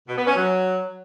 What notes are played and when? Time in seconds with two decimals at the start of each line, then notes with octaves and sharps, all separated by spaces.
0.08 B2
0.17 B3
0.26 C#4
0.36 F#3